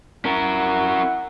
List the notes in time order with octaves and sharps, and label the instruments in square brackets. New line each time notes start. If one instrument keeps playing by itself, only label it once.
[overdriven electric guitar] C#4 A#4 [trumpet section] E4 F#5